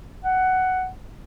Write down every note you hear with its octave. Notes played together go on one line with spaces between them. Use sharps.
F#5